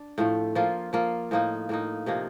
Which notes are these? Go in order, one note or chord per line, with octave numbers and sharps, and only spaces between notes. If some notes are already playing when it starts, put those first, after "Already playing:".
Already playing: D4
A2 F3 A3
F3 A#3 F4
F3 A#3 F4
A2 F3 A#3 D#4
A2 F3 A#3 D#4
C3 F3 A#3 D#4